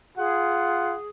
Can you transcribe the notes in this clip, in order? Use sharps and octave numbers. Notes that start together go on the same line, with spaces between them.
F4 G#4 F#5